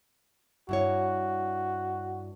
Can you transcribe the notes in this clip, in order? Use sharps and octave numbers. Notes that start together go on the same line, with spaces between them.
G2 E4 F#4 C#5